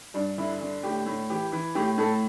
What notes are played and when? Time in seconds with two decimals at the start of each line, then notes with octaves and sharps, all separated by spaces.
0.14 G2 D4
0.38 D3 E4
0.61 D3
0.83 A2 G4
1.06 A2
1.30 E3 G4
1.52 E3
1.75 A2 G4
1.98 A2 A4